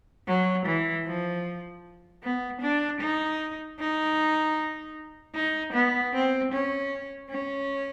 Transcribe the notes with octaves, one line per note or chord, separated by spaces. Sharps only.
F#3
E3
F3
B3
D4
D#4
D#4
D#4
B3
C4
C#4
C#4